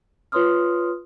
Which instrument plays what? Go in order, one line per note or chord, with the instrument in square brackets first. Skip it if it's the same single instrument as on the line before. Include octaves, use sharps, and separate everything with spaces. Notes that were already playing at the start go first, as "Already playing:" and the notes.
[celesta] F4 B4 C#5 C6 D#6 F6